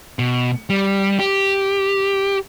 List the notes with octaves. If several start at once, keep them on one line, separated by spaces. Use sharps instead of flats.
B2
G3
G4